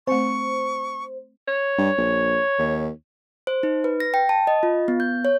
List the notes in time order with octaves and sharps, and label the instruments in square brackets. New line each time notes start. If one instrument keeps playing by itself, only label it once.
[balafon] A3 C4 [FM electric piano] C5 [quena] C#6
[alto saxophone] C#5
[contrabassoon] G2
A#1
D#2
[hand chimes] C5
D#4
B4
A#6
G5
A5
D#5
F4
B3
G6
C#5